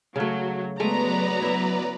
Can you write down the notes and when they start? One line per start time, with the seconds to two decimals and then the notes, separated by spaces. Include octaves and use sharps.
0.16 C#3 F#3 A3
0.80 F#3 G#3 A3 B3 B4 D5 D#5 A#5
1.42 E4 E5